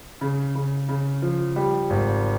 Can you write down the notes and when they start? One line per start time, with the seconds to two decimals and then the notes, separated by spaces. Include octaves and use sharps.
0.21 C#3
0.55 C#3
0.89 C#3
1.22 F3
1.56 G3
1.90 G#1